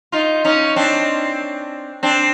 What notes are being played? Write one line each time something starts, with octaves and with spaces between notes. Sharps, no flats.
D#4 F4
C#4 D#4
C4 D4
C4 D4